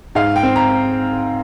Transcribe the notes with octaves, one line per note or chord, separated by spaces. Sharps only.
G#2 F5
G5
C4
A#5